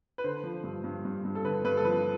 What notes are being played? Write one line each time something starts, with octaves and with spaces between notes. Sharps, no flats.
B4
D3 C5
F3
G2
G2
G2
G2
A4
D3 B4
G2 B4
A4
F3 B4